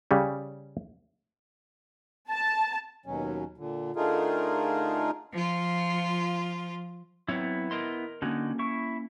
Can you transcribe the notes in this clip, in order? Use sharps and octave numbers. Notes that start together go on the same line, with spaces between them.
C#3 G3 C#4
A5
D#2 B2 F#3 C#4
A#2 D3
D3 A3 D#4 F4 G#4 A#4
F3 F4
F#3 B3 C4 E4 C#5
A#4 D#5 C6
D3 A#3 C#4 D#4 F#4
E4 C#6